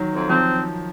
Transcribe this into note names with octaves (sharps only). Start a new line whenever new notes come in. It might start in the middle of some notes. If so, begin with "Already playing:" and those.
Already playing: D#3 F#3
F2
F3 C4